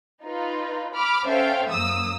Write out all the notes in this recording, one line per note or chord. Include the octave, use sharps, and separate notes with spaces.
D#4 F4 B4
B5 D6 F6
C#4 A4 C5 E5 F5 G5
F#2 A#3 D#6 E6